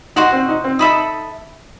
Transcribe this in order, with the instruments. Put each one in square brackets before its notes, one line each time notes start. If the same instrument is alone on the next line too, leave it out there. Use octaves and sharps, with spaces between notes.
[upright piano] D#4 [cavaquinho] F#4 C5 F#5
[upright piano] C4
D#4
C4
[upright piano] D#4 [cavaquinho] A4 E5 B5 D#6